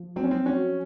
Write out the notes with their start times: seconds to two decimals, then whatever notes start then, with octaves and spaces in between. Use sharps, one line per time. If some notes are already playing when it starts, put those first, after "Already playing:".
Already playing: F3
0.16 F#3 C4
0.24 C#4
0.31 C4
0.46 C#4 F#4